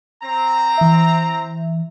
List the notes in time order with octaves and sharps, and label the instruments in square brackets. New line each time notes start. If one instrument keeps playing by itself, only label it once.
[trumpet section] C4 A#5
[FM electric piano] E3 E5